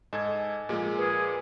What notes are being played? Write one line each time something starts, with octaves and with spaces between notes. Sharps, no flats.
G#2 A4 D#5 G#5 G#6
A#2 F3 G#3 A#3
G#4 B4